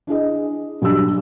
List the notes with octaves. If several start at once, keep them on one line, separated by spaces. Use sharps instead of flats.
D4 E4 G#4 D#5
B1 G3 D4 E6